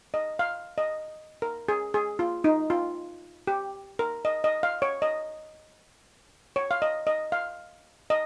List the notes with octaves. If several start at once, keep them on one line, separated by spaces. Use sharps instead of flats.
D#5
F5
D#5
A#4
G#4
G#4
F4
D#4
F4
G4
A#4
D#5
D#5
F5
C#5
D#5
C#5
F5
D#5
D#5
F5
D#5